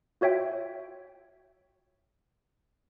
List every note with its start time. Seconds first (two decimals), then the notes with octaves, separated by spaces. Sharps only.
0.21 F4 F#4 C#5 E5 G5